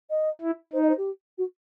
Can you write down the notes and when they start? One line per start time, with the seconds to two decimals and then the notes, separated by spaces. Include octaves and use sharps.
0.10 D#5
0.42 E4
0.73 D#4 C5
0.82 D#5
0.89 C5
0.97 G4
1.38 F#4